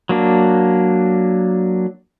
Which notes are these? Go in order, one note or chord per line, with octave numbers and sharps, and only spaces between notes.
F#3 A#3 D4